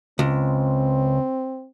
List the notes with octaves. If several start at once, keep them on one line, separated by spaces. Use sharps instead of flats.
C#2 C4